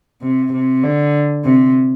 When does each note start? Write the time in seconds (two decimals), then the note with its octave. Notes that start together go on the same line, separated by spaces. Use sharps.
0.22 C3
0.53 C3
0.83 D3
1.44 C3